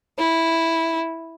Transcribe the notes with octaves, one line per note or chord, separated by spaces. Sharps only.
E4